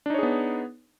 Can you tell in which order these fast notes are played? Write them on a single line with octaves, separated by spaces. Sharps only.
D4 D#4 C#5 G#4 B3